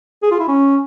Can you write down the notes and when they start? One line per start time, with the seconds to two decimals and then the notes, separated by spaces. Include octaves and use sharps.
0.23 G#4
0.31 F4
0.40 E4
0.48 C#4